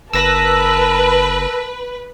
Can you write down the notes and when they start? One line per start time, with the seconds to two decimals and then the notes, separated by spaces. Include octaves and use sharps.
0.13 F#1 A#4 B4 A5 E6 A#6